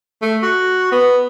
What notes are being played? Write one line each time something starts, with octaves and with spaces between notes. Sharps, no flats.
A3
F#4
B3